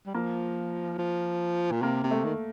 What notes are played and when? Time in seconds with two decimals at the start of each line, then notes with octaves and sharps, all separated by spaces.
0.06 G3
0.14 F3 A#3
0.99 F3
1.71 A#2
1.82 C3 A#3
2.03 C3
2.11 A3
2.25 D#3